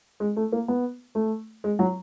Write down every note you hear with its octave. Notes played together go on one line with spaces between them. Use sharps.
G#3
A3
A#3
B3
A3
G#3
F#3